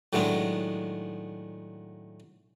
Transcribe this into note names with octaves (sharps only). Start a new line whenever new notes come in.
A2 D#3 F#3 G#3 B3 D4